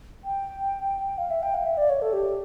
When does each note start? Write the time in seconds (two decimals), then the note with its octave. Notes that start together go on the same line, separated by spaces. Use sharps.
0.24 G5
1.18 F5
1.31 E5
1.43 G5
1.55 F5
1.65 E5
1.77 D5
1.90 C#5
2.02 A4
2.13 G4